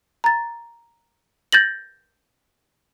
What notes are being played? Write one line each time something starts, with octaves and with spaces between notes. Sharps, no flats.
A#5 A6
G6 A6 A#6 F#7